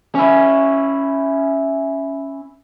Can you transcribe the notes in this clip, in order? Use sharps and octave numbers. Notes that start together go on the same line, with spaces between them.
C#4 E4